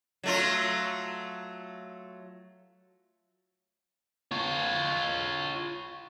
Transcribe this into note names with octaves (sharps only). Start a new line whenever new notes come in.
F#3 A3 F4
F4 C#5